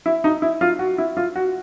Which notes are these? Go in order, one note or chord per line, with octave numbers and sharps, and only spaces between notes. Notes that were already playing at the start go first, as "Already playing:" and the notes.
E4
D#4
E4
F4
F#4
E4
F4
F#4